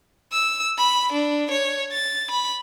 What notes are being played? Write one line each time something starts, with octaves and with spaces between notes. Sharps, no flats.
E6
B5
D4
C#5
A6
B5